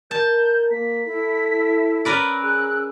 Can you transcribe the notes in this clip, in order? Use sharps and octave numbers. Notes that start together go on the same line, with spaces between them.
A#4 A5 G6
A#3 B6
E4 A4
C#4 A#4 B4 D5 E6
G#4 F#6